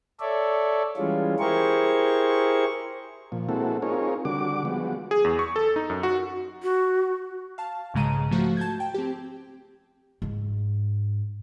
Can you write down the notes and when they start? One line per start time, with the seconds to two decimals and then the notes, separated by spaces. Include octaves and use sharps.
0.20 A4 C#5 D5 E5
0.97 E3 G3 G#3 C#4 F4
1.39 E4 G4 G#4 A#4 C5 C#6
3.32 A#2 F3
3.49 G#3 A#3 C4 E4 F#4 A4
3.82 C4 D#4 F4 G#4 A#4 C#5
4.25 D3 G3 F#4 D6
4.65 F3 G3 G#3 B3 F#4
5.11 G#4
5.24 E2
5.39 C#6
5.56 A4
5.76 D#4
5.90 F#2
6.03 F#4
6.63 F#4
7.58 F5 A5
7.94 B1 G#2 C#3 G#3 A#5 D#7
8.31 F3 A3 F#4
8.57 A5 G6 G#6
8.80 G5
8.94 C4 G4
10.22 G#2